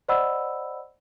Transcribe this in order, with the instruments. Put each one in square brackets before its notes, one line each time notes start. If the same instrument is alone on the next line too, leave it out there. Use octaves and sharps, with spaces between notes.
[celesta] C5 D5 D#5 F#5 B5 E6